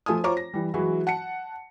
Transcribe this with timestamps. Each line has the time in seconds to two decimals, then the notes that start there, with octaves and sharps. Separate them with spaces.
0.06 F3 A3 F4 G#5 D#6
0.24 F4 C5 C#5 A#5 C#6 D6
0.37 A#6
0.54 E3 G3
0.74 E3 F#3 G#3 E4 F#4
1.07 F#5 A5 C#7